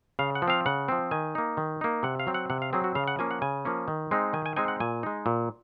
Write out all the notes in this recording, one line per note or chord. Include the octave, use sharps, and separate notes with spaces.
C#3 F5
F#5
F3
C4 F5
C#3 F#5
F3 C4
D#3 G#5
A#3 D#4
D#3
A#3 D#4
C3 F#5
F5
F#3 C4
F#5
C3 F#5
F5
F#3 C4 G#4
F#4
C#3 F5
F#5
F3 A#3 C#4 G#5
F#5
C#3 G#5
F3 A#3 C#4
D#3
G#3 C4 D#4
D#3 G#5
G#5
G#3 C4 D#4 G#5
F#5
A#2 G#5
G#3 D#4
A#2